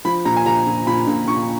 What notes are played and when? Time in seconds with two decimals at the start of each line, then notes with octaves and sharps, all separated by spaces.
0.05 F3 B5
0.25 A#2 A#5
0.37 G#5
0.46 F3 A#5
0.67 A#2
0.87 A#2 B5
1.07 A#2
1.28 A#2 C#6